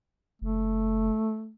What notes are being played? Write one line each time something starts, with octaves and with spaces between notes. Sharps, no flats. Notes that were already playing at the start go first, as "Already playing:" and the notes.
F#1 A3